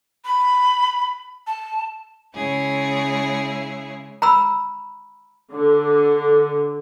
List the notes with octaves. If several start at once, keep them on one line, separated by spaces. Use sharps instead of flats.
B5
A5
C#3 G#3 E4 G#4 C#5
A#5 B5 E6
D3